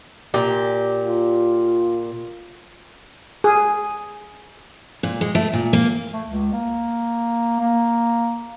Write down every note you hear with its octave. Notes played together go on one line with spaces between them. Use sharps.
A#2 G4
F4
G#4
A#2
G#3
A3
A#2
A#3
A3
C#2
A#3
A#3